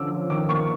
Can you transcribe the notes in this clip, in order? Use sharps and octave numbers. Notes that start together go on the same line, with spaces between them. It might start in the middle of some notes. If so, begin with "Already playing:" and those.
Already playing: D3 F3 C#4 D6 E6
F3
D#3 D6
A#3 C#6